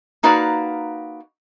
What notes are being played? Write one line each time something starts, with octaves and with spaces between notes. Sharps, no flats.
A#3 D#4 F#4 B4 D5 F5